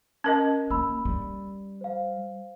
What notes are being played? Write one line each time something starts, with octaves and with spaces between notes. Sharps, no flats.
C#4 A#4 D#5
A#3 B5 E6
G3
C5 F5